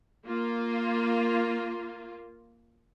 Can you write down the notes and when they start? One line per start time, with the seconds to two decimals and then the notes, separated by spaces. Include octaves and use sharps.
0.25 A#3 F4